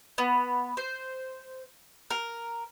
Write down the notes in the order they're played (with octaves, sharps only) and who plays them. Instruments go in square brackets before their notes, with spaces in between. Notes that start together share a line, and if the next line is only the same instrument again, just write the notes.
[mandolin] B3
C5
A#4